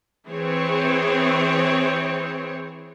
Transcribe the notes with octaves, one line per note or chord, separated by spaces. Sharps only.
E3 C4 G#4 C#5